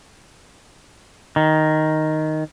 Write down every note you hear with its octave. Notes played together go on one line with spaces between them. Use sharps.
D#3